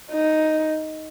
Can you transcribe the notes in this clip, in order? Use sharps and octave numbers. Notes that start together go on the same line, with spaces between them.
D#4